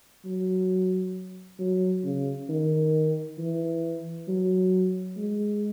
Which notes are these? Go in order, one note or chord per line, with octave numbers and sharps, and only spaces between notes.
F#3
F#3
C#3
D#3
E3
F#3
G#3